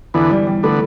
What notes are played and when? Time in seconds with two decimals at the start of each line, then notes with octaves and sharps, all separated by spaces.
0.14 E2 D3 E3 B3
0.31 G3
0.47 G3
0.63 D3 A3 B3